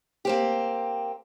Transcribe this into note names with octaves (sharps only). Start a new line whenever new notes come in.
A#3 C4 G4